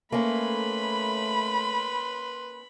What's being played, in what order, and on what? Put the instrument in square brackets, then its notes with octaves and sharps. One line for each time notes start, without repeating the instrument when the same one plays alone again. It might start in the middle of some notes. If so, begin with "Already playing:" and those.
[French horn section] A3 [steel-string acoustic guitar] A#3 C#4 [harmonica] B4 C6 [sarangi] B5